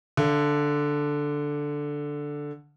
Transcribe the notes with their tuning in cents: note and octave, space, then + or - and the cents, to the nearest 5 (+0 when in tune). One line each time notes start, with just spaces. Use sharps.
D3 +0 F5 -40